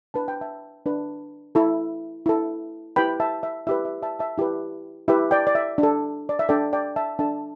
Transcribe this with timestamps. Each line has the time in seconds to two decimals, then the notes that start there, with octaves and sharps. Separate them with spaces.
0.14 D4 B4 A5
0.28 G5
0.41 E5 A5
0.86 D4 B4
1.55 E4 A4
2.26 E4 A4
2.96 E4 G4 B4 G5 B5
3.20 E5 A5
3.43 E5
3.67 E4 G4 B4 E5
3.85 E5
4.03 E5 A5
4.19 E5 A5
4.38 E4 G4 B4
5.08 E4 G4 B4 E5
5.31 D5 G5
5.47 D5
5.55 E5
5.78 D4
5.83 A4
6.29 D5
6.39 E5
6.49 D4 A4 D5 G5
6.73 D5 G5
6.96 E5 A5
7.19 D4 A4 E5 A5